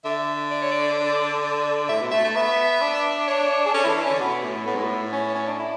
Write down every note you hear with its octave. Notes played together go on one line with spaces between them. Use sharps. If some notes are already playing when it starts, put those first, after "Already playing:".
D3 E5
D5
C#5
D5
D5
A2 E5
B2
A3 E5
A3
B3 E5
D4
C#5
G#4
C#4 A4
E4
E3
D4
E3
D3 C#4
B2 B3
A2
A2 B3
G#2
A2
C#4
C#4
D4
E4